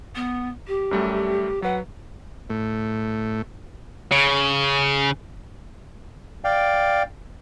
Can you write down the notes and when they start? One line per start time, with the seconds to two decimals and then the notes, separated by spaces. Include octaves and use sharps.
0.15 B3
0.67 G4
0.91 F#2 G3 A3
1.62 F#3 B4 F#5
2.50 A2
4.11 C#3
6.44 D5 F5 G5